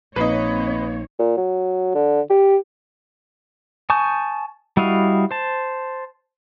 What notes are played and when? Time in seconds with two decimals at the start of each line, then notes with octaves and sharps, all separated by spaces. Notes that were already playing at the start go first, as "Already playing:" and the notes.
0.16 A#1 A#3 C4 D#4 B4 C#5 D#5
1.19 A#2
1.37 F#3
1.95 D3
2.30 G4
3.90 G#5 A5 C#6 D#6 G6
4.77 G3 E4 F#4 D#5 F5
5.31 C5 A5